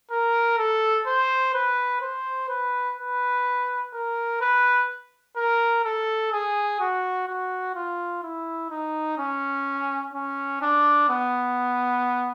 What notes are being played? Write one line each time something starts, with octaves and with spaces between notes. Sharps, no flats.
A#4
A4
C5
B4
C5
B4
B4
A#4
B4
A#4
A4
G#4
F#4
F#4
F4
E4
D#4
C#4
C#4
D4
B3